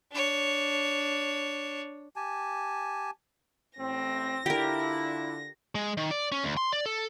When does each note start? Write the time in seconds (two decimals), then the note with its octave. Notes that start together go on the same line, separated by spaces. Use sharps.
0.12 D4 C#5
2.16 G4 G#5 A5
3.79 A1 A2 C4 A#6
4.46 D3 D4 E4 F4 G4 A#4
5.75 G#3
5.97 D#3
6.11 D5
6.32 C#4
6.44 D2
6.57 C6
6.73 D5
6.86 A4